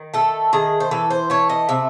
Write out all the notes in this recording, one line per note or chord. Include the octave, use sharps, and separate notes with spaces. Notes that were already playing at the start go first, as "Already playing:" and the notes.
Already playing: D#3
A3 A4
D#3 G#4
C5
E3 A4
C5
A3 C#5
D#5
C3 E5